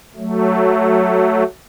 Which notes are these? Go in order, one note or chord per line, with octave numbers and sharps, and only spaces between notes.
F#3 A3